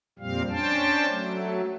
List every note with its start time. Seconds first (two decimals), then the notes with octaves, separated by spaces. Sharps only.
0.19 F2 A#2 G3 C4 F5
0.50 C#4 D4 C5 G5 A5
1.08 F#3 A3